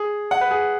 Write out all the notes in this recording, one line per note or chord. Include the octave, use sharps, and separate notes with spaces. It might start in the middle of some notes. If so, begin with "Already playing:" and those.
Already playing: G#4
F#5
B4
G#4